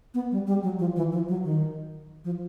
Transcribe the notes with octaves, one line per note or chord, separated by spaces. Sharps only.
B3
G3
G3
F#3
F3
E3
F3
F#3
D#3
F3